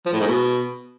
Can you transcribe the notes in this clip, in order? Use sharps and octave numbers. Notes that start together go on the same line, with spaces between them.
F3
A2
G#2
B2